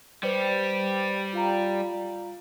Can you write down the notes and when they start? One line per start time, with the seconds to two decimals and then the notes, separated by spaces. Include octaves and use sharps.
0.23 G3 B4 C5 C#7
1.33 F4 F5 A#5